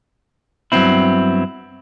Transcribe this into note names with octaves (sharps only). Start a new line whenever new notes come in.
G2 F#3 G#3 B3 C4 E4